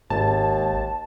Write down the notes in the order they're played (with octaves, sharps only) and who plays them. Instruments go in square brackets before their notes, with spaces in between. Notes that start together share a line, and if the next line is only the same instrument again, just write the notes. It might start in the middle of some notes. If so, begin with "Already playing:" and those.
[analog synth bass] G#1 [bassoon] D#2 [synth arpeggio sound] A5